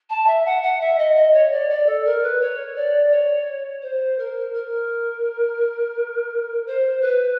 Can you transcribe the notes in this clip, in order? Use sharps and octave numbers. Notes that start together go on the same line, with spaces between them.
A5
E5
F#5
F#5
E5
D#5
D#5
C#5
D5
D5
A4
A#4
B4
C#5
D5
C#5
C5
A#4
A#4
C5
B4